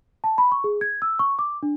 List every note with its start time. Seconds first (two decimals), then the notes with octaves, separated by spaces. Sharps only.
0.24 A5
0.38 B5
0.52 C#6
0.64 G#4
0.81 G#6
1.02 E6
1.19 C#6
1.39 D6
1.63 D4